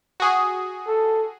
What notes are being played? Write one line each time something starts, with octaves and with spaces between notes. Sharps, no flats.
F#4 G#4
A4